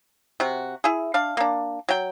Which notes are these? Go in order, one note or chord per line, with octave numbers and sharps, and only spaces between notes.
C3 F#4
E4 G#4
D4 F5
A#3 D4
F#3 G5